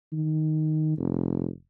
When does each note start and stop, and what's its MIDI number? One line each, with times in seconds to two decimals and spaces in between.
0.12 0.95 51
0.98 1.48 29